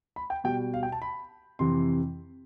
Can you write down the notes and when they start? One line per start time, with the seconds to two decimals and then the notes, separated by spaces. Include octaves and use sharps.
0.16 B5
0.30 G5
0.44 B2 G3 G5
0.74 F5
0.83 G5
0.92 A5
1.02 B5
1.59 F2 C3 E3 C6